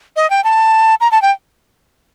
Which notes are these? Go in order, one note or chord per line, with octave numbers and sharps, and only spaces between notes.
D#5
G5
A5
A#5
A5
G5